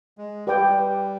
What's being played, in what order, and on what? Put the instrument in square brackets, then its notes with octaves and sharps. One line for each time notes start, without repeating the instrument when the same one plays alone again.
[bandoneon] G#3
[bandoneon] G3 [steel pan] G4 B4 D5 G5